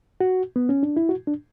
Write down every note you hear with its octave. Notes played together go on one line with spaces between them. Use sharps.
F#4
B3
C#4
D4
E4
F#4
D4